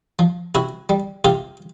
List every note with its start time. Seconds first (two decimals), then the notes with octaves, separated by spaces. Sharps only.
0.19 F3
0.55 C3 E4 F#4
0.89 G3
1.25 C3 F4 G4